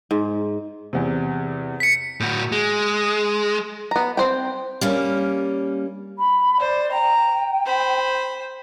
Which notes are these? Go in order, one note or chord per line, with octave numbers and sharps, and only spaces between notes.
G#2
E2 C3
B6 C#7
A2 F#4
G#3
B3 A#5
C4 C5 G5
G3 A#3 C#4
B5
C5 D5
G5 A#5
C5 B5